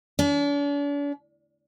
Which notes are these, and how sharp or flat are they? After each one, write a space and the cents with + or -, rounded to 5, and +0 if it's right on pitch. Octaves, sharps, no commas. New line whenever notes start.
D4 -45